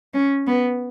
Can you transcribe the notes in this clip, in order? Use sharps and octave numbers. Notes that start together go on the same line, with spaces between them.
C#4
B3